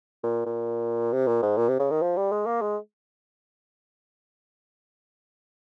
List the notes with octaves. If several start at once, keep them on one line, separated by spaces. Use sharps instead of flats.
A#2
A#2
C3
A#2
G#2
A#2
C3
C#3
D#3
F3
G3
G#3
A#3
G#3